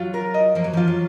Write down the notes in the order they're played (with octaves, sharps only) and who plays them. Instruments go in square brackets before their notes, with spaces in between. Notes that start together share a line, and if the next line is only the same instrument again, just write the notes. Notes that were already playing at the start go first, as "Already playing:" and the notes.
Already playing: [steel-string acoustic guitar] F#3 [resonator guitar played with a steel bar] F4
[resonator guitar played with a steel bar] A#4
D#5
[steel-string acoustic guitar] F3 [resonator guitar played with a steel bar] A#3
[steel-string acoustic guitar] F#3
[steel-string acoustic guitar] F3 [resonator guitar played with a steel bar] F4
[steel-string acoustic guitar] F#3